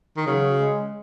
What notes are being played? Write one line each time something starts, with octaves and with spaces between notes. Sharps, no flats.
D#3
C#3 F#3
G#3